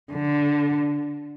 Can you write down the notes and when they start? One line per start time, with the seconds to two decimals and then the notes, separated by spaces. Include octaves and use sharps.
0.13 D3